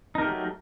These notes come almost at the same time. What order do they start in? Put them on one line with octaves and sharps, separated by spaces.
D#4 A#4 G4 A3 F#3